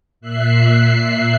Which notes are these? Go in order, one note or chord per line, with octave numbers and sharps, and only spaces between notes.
A#2 E5 F#6 C7